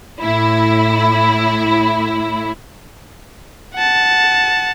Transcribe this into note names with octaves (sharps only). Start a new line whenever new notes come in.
A2 E4
F#5 A5